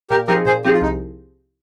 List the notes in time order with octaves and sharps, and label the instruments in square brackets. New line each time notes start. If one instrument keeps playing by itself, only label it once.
[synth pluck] A#2 [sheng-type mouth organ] G4 A#4
[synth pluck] F3 C4 D#4 G#4 [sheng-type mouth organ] G4 A#4
[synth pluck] A#2 [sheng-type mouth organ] G#4 C5
[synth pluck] F3 C4 D#4 G#4 [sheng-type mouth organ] G4
[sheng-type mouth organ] F4
[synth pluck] C2 [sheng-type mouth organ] D#4